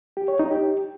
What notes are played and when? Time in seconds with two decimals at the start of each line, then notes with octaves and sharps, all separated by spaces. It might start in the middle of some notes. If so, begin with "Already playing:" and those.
0.17 G4
0.28 C#5
0.39 D#4
0.51 G4